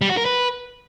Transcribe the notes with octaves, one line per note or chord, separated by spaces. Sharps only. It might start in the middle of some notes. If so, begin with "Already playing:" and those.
G3
F#4
A#4
B4